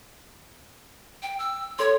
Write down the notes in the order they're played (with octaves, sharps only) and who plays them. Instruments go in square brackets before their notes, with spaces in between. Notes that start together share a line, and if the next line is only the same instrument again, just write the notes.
[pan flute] G5
E6
[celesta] A4 C6 [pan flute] C#5